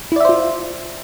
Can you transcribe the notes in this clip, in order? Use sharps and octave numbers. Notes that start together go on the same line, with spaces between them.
E4 F4 C5 D5 E5